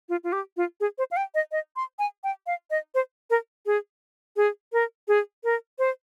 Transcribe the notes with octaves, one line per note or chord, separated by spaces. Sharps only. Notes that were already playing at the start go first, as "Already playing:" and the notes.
F4
F4
G4
F4
G#4
C5
F5
G5
D#5
D#5
C6
G#5
G5
F5
D#5
C5
A#4
G#4
G#4
A#4
G#4
A#4
C5